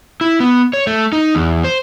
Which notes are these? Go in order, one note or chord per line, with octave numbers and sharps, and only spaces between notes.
E4
B3
C#5
A3
D#4
E2
C5